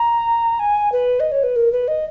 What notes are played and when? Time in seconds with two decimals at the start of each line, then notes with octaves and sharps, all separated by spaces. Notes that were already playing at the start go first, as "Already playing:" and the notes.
Already playing: A#5
0.59 G#5
0.92 B4
1.20 D#5
1.31 C#5
1.43 B4
1.56 A#4
1.72 B4
1.88 D#5